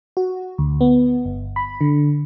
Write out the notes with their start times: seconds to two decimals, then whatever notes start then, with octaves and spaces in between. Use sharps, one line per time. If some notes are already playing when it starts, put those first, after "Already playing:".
0.17 F#4
0.58 D2
0.81 B3
1.25 G1
1.56 B5
1.81 D3